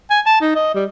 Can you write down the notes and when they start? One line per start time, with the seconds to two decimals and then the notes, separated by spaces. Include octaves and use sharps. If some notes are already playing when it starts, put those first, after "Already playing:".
0.10 G#5
0.26 A5
0.41 D#4
0.55 D#5
0.74 G3